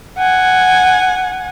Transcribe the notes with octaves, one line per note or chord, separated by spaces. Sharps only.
F#5 G#5